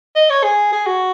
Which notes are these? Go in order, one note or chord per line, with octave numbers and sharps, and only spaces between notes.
D#5
C#5
G#4
G#4
F#4